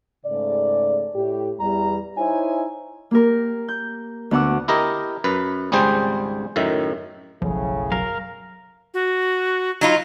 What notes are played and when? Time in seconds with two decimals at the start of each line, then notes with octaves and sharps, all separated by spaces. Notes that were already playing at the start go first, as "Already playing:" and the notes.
0.26 G#2 C#3 A3 D5
1.16 A2 G4
1.60 E2 G3 A#5
2.17 D#4 E4 C5 C#5 G#5
3.11 A#3 G4 A#4
3.68 G6
4.31 D2 B3 F#5 D6 E6
4.68 E4 G4 A#4 D#5
5.24 F#2 B4
5.72 G#1 C#2 G3 G#4 C5 G5
6.56 F#2 A2 D#3 E5
7.42 F#1 B1 A2 C#3 F3
7.92 F#3 A#4 F5
8.94 F#4
9.81 F#3 D#4 F4